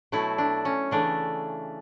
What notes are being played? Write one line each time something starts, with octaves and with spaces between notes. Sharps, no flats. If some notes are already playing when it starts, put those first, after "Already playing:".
B2 F#3 A3 E4
D4
C#4
C#3 E3 A3 D4